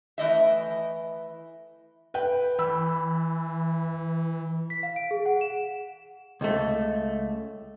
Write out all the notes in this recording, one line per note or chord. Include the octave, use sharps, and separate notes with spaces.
E3 A3 D#5 E5
B4 G5
E3 B5 E6
B6
F5
D7
G#4
F#5
E7
C#2 A3